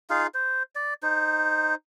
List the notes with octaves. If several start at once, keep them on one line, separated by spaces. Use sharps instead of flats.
D#4 F4 G#4 F5
C5
D5
D#4 C5